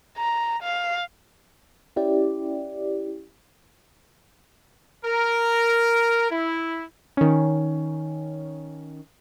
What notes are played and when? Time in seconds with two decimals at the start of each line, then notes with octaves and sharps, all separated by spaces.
0.17 A#5
0.62 F5
1.96 C#4 E4 G4 D5
5.05 A#4
6.31 E4
7.17 D#3 C#4